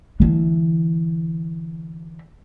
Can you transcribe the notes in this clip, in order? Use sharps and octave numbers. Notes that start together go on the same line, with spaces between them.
D3 E3